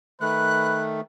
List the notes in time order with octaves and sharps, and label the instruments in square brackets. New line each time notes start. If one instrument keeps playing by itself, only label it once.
[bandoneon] D#3 A3 [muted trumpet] B4 [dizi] F#6